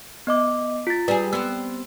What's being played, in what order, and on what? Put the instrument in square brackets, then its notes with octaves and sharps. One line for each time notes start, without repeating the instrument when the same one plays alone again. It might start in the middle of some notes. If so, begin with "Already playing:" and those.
[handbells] B3 D#5 D6
F4 A6
[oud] G3 G#4 [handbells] B4
[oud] B3 C4 [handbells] E6